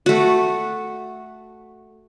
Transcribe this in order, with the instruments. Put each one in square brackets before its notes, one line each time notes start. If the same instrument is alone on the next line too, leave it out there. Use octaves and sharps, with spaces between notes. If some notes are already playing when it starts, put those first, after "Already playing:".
[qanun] A3 F#4